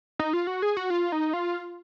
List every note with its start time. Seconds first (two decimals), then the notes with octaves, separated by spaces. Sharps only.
0.19 D#4
0.33 F4
0.47 F#4
0.62 G#4
0.77 F#4
0.90 F4
1.12 D#4
1.33 F4